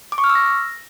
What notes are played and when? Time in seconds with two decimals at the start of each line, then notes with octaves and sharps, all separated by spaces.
0.12 D6
0.18 C#6
0.24 F6
0.30 E6
0.35 A#6